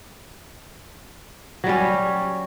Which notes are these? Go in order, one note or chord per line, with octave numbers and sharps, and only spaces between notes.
F#3 G3 C#4